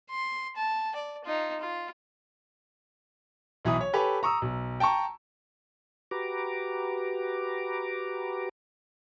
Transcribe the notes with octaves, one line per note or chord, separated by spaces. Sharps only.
C6
A5
D5
D#4 F4
F4
B1 E3 B5 D#6
C#5
G4 A4 B4 C#5 G#5
A#5 C#6 D#6 E6
B1
G5 A5 A#5 C#6
F#4 G4 B4 A#5 D6